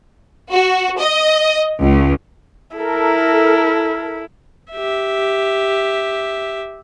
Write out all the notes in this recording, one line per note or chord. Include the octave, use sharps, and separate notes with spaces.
F#4
D#5
C#2
E4 A4 A#4
G4 E5